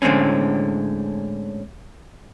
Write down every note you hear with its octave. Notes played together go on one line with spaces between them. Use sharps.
A2 D3 G#3 C4 C#4